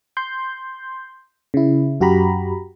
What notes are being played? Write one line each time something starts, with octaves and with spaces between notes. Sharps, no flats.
C6 G6
C#3 E4
F#2 F#4 G4 A#5 B5